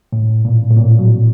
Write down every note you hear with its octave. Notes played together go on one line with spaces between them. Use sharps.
A2
A#2
A2
A#2
F#3